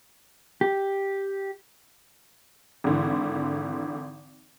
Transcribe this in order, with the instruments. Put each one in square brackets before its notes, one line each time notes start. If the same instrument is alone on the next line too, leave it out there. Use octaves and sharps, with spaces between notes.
[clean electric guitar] G4
[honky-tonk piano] G#1 D3 E3